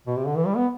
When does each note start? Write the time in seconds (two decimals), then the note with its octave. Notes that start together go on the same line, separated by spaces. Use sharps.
0.07 B2
0.17 C3
0.27 D3
0.37 E3
0.46 G3
0.56 B3